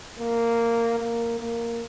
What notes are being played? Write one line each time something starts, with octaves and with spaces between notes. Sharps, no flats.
A#3
A#3
A#3